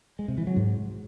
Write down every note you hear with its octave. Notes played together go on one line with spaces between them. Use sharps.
G#3
C3
E3
F#3
G#2